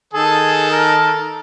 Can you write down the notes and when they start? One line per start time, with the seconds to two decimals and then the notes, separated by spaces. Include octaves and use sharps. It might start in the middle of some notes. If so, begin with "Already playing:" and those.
0.14 D#3 G#4 A4 A5
0.72 A#4